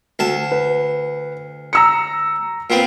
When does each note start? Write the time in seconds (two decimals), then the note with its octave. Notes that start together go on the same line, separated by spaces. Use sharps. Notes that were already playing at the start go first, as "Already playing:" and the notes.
0.19 D2 A5
0.52 B4
1.73 A#5 E6 C#7
2.70 A#2 B3 C4